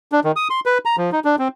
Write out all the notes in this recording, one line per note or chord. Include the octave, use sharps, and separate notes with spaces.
D4
D#3
D#6
C6
B4
A#5
F3
D#4
D4
C4